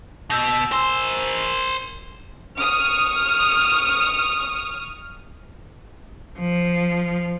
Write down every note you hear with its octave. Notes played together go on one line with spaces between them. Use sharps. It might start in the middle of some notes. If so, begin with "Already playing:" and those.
B2 E6 G6 A#6
A#4 C5 G#5 C6 E6
C#6 D#6 F6
F3